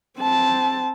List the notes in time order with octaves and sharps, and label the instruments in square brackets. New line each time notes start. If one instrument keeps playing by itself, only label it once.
[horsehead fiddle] C4 A5